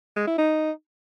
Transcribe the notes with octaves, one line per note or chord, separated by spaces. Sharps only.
G#3
E4
D#4